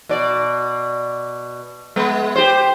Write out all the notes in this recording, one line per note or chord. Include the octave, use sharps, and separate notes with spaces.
B2 D5
G#3 B3
G4 C5